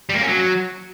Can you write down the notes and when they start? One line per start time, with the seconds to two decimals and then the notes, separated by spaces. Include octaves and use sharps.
0.09 G3
0.16 A#3
0.22 C#4
0.28 F#3